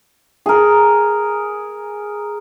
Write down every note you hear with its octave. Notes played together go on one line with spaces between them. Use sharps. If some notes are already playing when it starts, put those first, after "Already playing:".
G#4 A#4